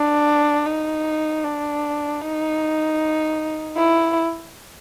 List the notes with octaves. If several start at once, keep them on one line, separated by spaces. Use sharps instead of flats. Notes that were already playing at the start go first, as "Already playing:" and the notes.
Already playing: D4
D#4
D4
D#4
E4